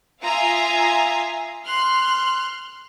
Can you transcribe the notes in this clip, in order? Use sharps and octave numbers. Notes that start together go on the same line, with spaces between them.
F4 E5 F5 G#5 A#5 D#6
C6 F6 F#6